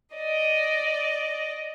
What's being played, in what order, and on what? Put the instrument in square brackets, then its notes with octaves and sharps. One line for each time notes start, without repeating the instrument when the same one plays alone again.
[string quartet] D5 D#5